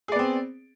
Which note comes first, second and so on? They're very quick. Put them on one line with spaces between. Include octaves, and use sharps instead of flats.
G#4 D5 B3 C4